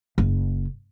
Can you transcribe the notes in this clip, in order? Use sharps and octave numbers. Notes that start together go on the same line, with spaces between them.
F#1